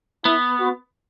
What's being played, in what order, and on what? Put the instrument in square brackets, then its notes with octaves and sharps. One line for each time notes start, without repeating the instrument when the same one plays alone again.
[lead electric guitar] B3 [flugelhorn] E4
[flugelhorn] F#4